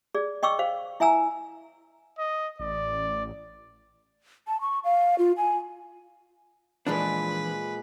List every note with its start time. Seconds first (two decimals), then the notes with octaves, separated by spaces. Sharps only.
0.15 G#4 D5
0.43 D#5 G5 C#6 D6 E6
0.59 C5 F5
1.00 E4 E5 G#5 A#5 E6
2.18 D#5
2.60 A1 D5
4.48 A5
4.61 C#6
4.84 F5
5.18 F4
5.37 G#5
6.87 A#2 E3 F3 G#3 D4 B4